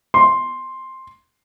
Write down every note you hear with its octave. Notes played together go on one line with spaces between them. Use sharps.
C6